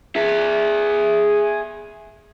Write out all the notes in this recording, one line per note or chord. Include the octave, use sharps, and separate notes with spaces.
G#4 E5